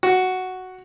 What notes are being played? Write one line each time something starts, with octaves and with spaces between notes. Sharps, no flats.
F#4